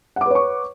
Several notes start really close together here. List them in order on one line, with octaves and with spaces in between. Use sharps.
F#5 D6 B4 C#5 C#6